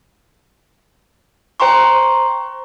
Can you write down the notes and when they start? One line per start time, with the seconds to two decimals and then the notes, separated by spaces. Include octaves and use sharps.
1.60 C5 G5 A#5 C6 C#6